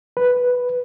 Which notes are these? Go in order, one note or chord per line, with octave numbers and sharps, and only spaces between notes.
B4